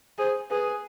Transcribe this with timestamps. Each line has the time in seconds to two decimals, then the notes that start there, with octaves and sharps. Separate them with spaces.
0.18 G#4 C5
0.50 G#4 B4